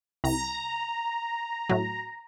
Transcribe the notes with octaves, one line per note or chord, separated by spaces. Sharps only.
C2 A#5
A2 F#3